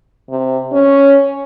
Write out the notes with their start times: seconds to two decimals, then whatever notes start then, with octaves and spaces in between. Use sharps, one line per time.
0.30 C3
0.72 C#4